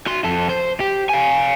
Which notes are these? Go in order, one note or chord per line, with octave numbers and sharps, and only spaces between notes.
F#4 C6
F2 A4
C5
G4
F5 G#5